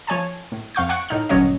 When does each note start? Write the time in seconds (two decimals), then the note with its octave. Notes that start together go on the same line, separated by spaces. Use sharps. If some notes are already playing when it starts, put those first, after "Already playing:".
0.07 F3 C#5 G#5 A5
0.52 A2
0.75 F2 F5 C#6 G6
0.89 F#5 C#6 F#6 D7
1.09 A2 D#4 F6
1.29 G1 A#2 F#3 C#4 C#5 D#5